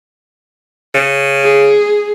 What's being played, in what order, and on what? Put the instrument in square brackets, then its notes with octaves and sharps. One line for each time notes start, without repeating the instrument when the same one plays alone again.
[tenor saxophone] C#3
[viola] G#4